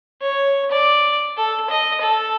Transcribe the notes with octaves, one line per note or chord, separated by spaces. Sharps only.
C#5
D5
A4
D#5
A4